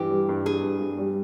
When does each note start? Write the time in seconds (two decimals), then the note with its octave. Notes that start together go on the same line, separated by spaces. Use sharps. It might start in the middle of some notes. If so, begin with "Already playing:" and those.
Already playing: G2 E3 G4
0.11 G3
0.29 G2
0.46 G2 G#4
0.63 G2
0.81 G2
0.98 G3